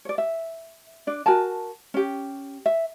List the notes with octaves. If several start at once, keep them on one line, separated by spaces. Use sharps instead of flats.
C#5 D5
E5
D4 D5
F#4 A#4 G#5 A5
C#4 G4
E5